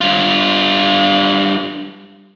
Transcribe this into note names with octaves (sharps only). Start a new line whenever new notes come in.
G2 F4